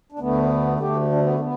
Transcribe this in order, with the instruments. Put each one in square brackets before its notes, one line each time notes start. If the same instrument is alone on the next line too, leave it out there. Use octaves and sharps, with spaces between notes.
[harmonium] D4
D2 D3 A3 B3
D2 D3 A3 G4
D4
B3
B3